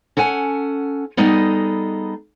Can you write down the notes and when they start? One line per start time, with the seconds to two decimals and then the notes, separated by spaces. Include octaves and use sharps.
0.17 C#4 A4 F#5 G#5
1.17 G3 B3 D#4 G#4 A4 D#5